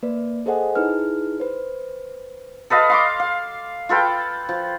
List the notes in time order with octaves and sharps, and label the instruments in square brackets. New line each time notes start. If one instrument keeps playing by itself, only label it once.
[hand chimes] A#3 B4 D5
G#4 A4 C5 D#5 F#5 G#5
D#4 E4 G#4 B4 F6
B4 C5
[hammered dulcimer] A4 B4 D#5 F5
F5 C6 D6
F5
F4 A4 B4 G5
F3